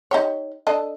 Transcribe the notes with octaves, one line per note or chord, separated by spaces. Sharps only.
D#4 G4 C#5
D4 A4 D#5